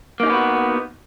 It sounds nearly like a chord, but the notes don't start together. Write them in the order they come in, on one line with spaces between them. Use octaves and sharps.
A#3 D#4 C#4 B3 F#4